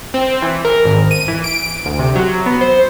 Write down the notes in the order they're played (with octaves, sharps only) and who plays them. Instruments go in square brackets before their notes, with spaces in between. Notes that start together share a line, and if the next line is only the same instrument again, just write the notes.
[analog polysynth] C4
E3
A#4
G#1
D#7
E3
D7
D2
C3
F#3
B3
C5